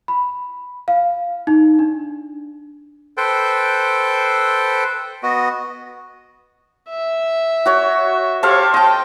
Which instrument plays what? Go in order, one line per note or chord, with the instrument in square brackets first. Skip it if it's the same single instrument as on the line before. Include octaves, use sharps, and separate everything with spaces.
[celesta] B5
F5
D#4
D4
[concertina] A4 B4 C5 G5
B3 F#4 D#5
[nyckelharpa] E5
[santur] F#4 C#5
[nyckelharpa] G4 C#5 [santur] A4 C5 F5
[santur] D#5 A5 [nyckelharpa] G5